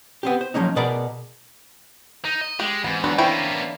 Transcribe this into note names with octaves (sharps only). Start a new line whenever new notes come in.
B3 C4 G4
C5
F3 F#3 A#3 C#4 D#4
B2 B3 G#4 A#4 D5 B5
D#4
D#5
G#3 G4
G#2 E3 B3 C4
F#3 B3 C4 D4
A#3 B3 C#4 E4 C5 G5